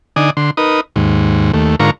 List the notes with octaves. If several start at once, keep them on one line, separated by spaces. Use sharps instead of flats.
D3 D#4 D5 G#5 D#6
D3 C6
D#4 A#4 B4 D#6
D#2 G#2
D#2 A3
G#2 D3 F4 A#4 A#5 C#6